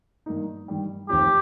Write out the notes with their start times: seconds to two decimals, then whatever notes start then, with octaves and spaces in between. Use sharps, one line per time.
0.26 G2 D#3 A#3 D#4
0.68 G2 D#3 G3
1.09 F1 D#2 D#3 C4 F4 G4